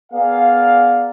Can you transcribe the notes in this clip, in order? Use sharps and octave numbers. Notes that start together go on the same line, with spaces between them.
B3 G#4 A#4 D5 F5